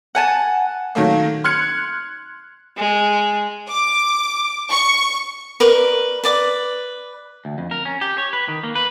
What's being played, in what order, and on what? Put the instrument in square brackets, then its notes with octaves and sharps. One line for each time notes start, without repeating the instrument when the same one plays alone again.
[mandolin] F#5 G#5 A5
[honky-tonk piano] D#3 F#3 A3 A#3
C6 F6 F#6 G#6 C#7
[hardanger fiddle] G#3
[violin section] D6
C#6
[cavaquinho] A#4 B4 D5 C#6
B4 D5 D6
[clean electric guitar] D2
F2
A#4
C#4
G4
C#5
B4
D#3
A#3
B4